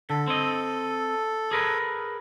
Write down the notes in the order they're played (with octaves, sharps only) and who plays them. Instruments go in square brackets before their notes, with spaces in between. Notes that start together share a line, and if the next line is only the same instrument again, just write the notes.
[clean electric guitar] D3 [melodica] A4
[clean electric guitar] C4 D#5
G#4 A#4 B4